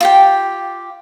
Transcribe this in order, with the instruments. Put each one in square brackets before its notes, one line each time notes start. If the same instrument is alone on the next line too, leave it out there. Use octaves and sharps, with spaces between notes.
[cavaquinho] F4 G4 G5